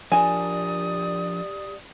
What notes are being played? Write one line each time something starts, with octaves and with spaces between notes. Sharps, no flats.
F3 D4 G4 A#4 D5 G#5 D#6